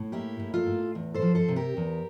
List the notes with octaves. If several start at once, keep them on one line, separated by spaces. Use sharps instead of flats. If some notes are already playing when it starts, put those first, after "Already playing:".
Already playing: A2
A#3 E4 G4
A2
F4 A4
A2
E2
A4 C5
F3
A4 C5
C3
G4 A#4
E2